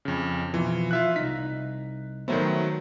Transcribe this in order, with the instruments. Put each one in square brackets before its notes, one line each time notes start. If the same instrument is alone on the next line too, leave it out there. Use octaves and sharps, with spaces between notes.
[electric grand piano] F2 C#3
[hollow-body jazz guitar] B2 F3 [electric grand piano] E3
[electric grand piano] F4 E5 F#6
[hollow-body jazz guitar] C2 D#4 [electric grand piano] B6
[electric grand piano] D#3 F#3 A3 [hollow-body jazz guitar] B3 C5 E5